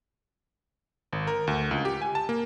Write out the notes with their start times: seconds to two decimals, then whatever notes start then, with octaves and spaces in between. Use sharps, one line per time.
1.13 G#1
1.27 A#4
1.47 D2
1.71 C#2
1.85 G4
2.02 G#5
2.15 A5
2.29 A#3